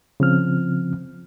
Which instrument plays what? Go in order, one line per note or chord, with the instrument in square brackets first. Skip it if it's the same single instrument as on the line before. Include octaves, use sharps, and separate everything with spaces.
[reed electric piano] C#3 F3 C4 F6